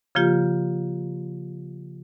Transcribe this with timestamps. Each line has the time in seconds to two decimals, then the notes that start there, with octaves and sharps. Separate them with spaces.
0.15 C#3 F3 A#3 F4 G4